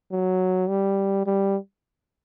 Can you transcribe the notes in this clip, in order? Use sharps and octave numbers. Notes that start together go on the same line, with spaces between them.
F#3
G3
G3